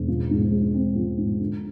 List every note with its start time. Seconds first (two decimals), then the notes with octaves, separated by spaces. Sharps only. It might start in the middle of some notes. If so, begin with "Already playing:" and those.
Already playing: E1
0.08 F3
0.31 G#2
0.52 G#3
0.74 C4
0.96 F3
1.18 G#2
1.41 D3